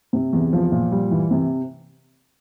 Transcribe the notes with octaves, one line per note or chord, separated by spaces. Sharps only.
C3
E2
F3
A#2
G3
E3
C3